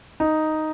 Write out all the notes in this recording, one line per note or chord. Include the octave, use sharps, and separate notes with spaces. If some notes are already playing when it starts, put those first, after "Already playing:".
D#4